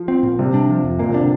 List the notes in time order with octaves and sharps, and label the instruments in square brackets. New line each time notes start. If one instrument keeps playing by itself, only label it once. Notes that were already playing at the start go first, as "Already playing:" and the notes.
Already playing: [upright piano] F3
[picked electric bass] C4
A#2
[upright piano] C3 [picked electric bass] G3
[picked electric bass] D4
F3
F2
[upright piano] A#2 [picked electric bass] A#3
[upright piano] C3
[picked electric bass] D4
[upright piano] D3